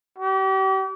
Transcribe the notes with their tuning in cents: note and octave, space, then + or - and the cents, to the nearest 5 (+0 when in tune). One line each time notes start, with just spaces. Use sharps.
G4 -40